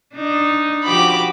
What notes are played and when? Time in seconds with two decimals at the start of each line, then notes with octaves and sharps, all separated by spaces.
0.15 D4 D#4
0.85 F3 F#4 G4 B5 D6